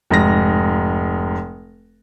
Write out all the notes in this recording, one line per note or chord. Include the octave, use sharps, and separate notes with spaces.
F1 G#2 A#6